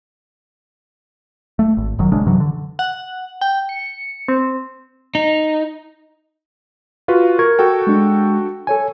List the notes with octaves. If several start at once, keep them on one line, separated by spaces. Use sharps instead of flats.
A3
G#1
F#1 D#3 F#3
A#1 C#3 G#3 D4
F#2 C3 E3 F#3
D3
F#5
G5
C#7
C4
D#4
F4 F#4 B4
A#4 C#6 G#6
F#4 A4 G5
G#3 D4
A4 C#5 G#5